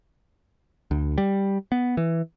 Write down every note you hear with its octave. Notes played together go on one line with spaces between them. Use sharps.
D2
G3
B3
E3